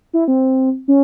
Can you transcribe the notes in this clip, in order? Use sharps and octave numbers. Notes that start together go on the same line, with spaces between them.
E4
C4
C#4